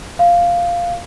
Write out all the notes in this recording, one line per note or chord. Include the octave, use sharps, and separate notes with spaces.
F5